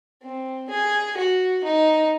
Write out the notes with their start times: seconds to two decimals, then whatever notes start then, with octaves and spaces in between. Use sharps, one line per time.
0.22 C4
0.69 G#4
1.17 F#4
1.64 D#4